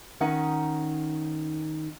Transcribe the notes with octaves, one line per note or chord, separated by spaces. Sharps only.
D#3 C#4 D#4 F#5